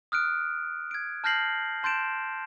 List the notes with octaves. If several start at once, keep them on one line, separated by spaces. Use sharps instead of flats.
D#6 F6 F#6 D7
G#6 D7
A5 F6 G6 A#6 C7 F#7
A5 C6 G6 A6 D7 E7